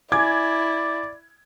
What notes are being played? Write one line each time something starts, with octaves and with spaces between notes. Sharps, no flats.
E4 D5 G#5 D6 G#6